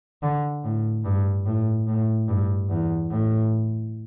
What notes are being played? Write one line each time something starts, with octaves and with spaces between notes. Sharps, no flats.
D3
A2
G2
A2
A2
G2
E2
A2